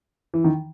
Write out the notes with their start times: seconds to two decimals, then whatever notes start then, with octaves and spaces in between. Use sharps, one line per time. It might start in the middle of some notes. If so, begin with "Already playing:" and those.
0.34 E3
0.44 D#3